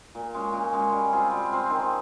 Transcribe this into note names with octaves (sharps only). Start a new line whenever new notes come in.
A#2
G#3 C#4
A#2
G#3 C#4
G3
C4 F4 G#4
G3
C4 F4 G#4
D#3